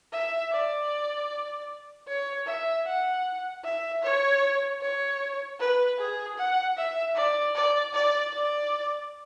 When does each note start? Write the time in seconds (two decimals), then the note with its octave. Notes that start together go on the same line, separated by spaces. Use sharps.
0.12 E5
0.51 D5
2.08 C#5
2.47 E5
2.86 F#5
3.64 E5
4.03 C#5
4.81 C#5
5.60 B4
5.99 G#4
6.38 F#5
6.77 E5
7.16 D5
7.55 D5
7.94 D5
8.33 D5